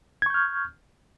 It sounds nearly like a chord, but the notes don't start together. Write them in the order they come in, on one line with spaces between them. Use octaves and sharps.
G#6 C#6 G6 F6